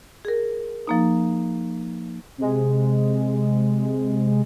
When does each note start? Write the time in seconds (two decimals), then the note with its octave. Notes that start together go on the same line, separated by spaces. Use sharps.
0.25 G#4 A#4
0.87 F3 A#3 D#4
2.38 C3 G#3